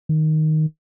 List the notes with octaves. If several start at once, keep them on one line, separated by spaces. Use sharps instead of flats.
D#3